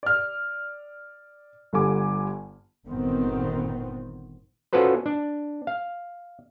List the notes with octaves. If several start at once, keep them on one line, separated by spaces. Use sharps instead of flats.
D5 F6
G1 D3 G3 G#5 D6
G1 A#2 D#3 B3 C4
C#4 F4 F#4 A4 B4 C5
D4
F5